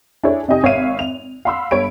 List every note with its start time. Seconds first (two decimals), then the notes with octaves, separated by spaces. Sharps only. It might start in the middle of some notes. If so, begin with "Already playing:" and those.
0.24 D4 E4 G#4 A4 C#5
0.48 C3 D#4 G4 D#5 G#5
0.63 G#1 C#5 E5 F5 D#7
0.99 F7
1.45 F5 F#5 B5 C6 E6
1.71 G1 C#5 B5 D7